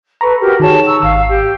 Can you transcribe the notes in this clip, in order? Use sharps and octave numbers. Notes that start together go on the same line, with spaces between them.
A4 B4 A#5 B5 C#6
F#4 G4 A#4
D#3 G#4 C#5 A5
A#5 C#6 E6
G#1 F5 E6
G4